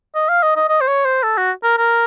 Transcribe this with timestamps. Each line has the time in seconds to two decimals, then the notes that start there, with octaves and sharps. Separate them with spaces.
0.15 D#5
0.29 F5
0.43 D#5
0.56 D#5
0.69 D#5
0.81 C5
0.88 C#5
1.05 C5
1.23 A4
1.37 F#4
1.63 A#4
1.78 A#4